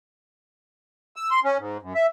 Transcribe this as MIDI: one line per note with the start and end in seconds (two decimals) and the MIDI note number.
1.16 1.30 88
1.31 1.40 84
1.44 1.58 61
1.58 1.77 44
1.82 1.93 42
1.95 2.06 76